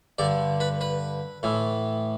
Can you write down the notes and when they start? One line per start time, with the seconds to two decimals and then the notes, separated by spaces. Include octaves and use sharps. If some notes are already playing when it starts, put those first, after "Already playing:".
0.18 G2 D3 D5
0.60 B4
0.81 B4
1.43 A2 E3